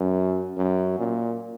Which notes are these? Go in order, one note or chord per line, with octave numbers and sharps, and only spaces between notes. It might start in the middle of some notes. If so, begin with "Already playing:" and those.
Already playing: F#2
F#2
A#2